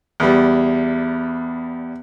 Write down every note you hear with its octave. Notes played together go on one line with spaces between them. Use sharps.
E2 G3